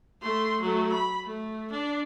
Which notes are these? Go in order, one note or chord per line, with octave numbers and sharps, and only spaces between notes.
A3 C6
F#3 A3
B5
A3
D4